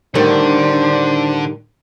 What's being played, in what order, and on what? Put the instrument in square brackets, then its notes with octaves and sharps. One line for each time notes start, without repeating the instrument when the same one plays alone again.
[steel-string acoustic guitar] A2 D#3 G3 [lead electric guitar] D3 [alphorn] D4 [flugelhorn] C5